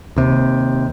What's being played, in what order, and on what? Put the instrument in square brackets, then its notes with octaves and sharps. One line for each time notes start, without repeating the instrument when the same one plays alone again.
[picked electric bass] D#2 C3